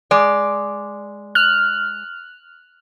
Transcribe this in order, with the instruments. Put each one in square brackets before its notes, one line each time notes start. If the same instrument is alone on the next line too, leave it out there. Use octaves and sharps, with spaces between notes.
[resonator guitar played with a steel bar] G#3 D5
[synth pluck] F6 F#6